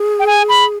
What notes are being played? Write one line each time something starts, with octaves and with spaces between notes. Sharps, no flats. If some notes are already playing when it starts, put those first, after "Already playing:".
Already playing: G#4
G5
G#5
B5